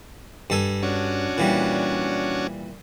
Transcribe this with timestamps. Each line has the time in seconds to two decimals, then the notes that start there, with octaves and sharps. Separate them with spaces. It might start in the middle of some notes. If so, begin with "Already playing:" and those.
0.50 G2 A4 G#5
0.83 C#4 D4 F#4
1.38 A#2 E3 G3